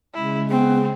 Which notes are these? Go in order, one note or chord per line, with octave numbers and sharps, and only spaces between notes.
C#3 G#3 E4
B3 C4 G#4